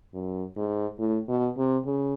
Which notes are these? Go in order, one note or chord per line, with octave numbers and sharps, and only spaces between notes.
F#2
G#2
A2
B2
C3
C#3